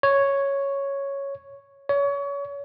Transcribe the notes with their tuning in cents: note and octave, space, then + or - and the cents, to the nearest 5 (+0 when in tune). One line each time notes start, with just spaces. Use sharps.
C#5 +0
C#5 +30